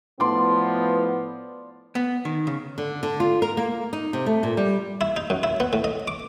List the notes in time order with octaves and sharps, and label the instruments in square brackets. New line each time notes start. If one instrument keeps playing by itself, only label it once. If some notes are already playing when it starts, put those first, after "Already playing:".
[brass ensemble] A2 F3 B3 [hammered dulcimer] D5 C6
[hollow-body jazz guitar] B3
D#3
C#3
[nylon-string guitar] D3
D3
F4
A#4
A#3
D#4
C3
A3
A#2
G3
[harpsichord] E4
D#4
F#2
E4
B3
A2
D#5
D6